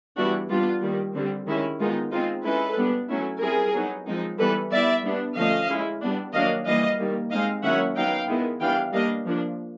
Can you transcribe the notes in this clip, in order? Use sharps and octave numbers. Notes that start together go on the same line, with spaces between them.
E3 G3 B3 D4 E4 F#4
G3 B3 D4 F4
D#3 G3 A#3
D3 G3 C4
D#3 G#3 C#4 E4
D#3 G#3 B3 D#4 F4
G#3 C4 D#4 F4
G#3 C#4 E4 A4 B4
G3 B3 D4
F#3 A3 C#4 E4
G3 C4 E4 G#4 A#4
F#3 B3 D#4
F3 G#3 C4 D#4
E3 G3 B3 A4 B4
G3 B3 E4 D5 E5
G3 B3 D4
D3 F3 A3 C#4 D#5 F5
G#3 C#4 E4
G3 B3 D4
D#3 F#3 A#3 D4 D#5 F5
E3 G3 A#3 D#5 F5
D#3 G3 A#3
G#3 C4 D#4 D#5 F5
D#3 F#3 A#3 C#4 E4 E5 F#5
F#3 B3 D#4 F5 G5
D#3 G#3 B3 E4
E3 G3 B3 D4 F5 G5
G3 A#3 D4 D#5 F5
F3 A#3 D4